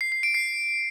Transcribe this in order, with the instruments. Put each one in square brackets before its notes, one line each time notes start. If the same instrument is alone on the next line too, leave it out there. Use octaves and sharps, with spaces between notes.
[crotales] C7
C7
D7
C7